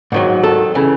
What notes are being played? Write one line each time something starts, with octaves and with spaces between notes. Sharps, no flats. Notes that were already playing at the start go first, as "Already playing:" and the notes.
G#2 D#3 F#3
A4
C#3 E3